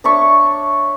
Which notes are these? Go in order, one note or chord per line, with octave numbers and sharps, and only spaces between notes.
D4 C#5 E5 C#6